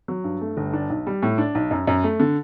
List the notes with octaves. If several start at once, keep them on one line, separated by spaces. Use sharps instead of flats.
F#3
G2
A3
G1
D4
B1
G3
A2
D4
B1
F#2
F#2
A3
D3